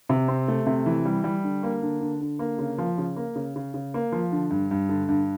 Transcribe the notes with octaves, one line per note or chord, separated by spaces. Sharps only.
C3
C4
A3
C3
E3
G3
G3
D3
A#3
D3
D3
D3
A#3
C#3
F3
C#3
A#3
C#3
C#3
C#3
A#3
F3
D3
G2
G2
D3
G2